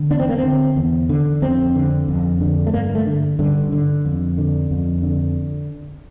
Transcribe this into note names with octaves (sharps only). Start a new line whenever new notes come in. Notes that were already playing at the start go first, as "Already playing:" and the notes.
Already playing: D3
E2 D4
C4
A#3
C4
D3
E2
D3
F2 C4
D3
F2
D3
A3
G2 A#3
A3
D3
G2 D3
D3
F2
D3
F2
D3